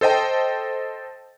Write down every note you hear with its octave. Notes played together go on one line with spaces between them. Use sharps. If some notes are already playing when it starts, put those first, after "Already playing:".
A4 C5 D#5 G5 A5